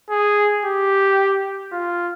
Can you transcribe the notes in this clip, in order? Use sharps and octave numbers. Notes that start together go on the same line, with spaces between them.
G#4
G4
F4